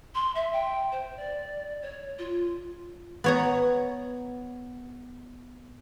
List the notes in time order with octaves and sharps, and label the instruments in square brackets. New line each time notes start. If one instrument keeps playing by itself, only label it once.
[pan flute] C6
E5
G5
C5
D5
C#5
F4
[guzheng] B3 C#5 A#5